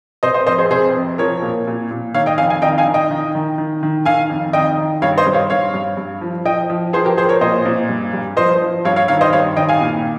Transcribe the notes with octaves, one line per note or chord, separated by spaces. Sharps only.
C3 C5 D#5
C5 D#5
F2 C5 D#5
G#4 C5
C3 G#4 C5
F2
F3 A#4 C#5
A#2
A#2
A#2
D#3 C#5 F5
D#5 G5
F2 F5 G#5
F5 G#5
D#3 D#5 G5
F5 G#5
D#3
D#5 G5
D#3
D#3
D#3
D#3
D#3 F5 G#5
F2
D#3 D#5 G5
D#3
G2 C#5 F5
C5 D#5
G2
C#5 F5
G2 C#5 F5
G2
G2
F3
F3 D#5 G5
F3
F3 G#4 C5
G4 A#4
F3 G#4 C5
A#4 C#5
A#2 C5 D#5
A#2
G2
G2
F3 C5 D#5
F3
G2 C#5 F5
C#5 F5
D#3 C#5 F5
C5 D#5
G2 C#5 F5
D#3 D#5 G5
F5 G#5
A#2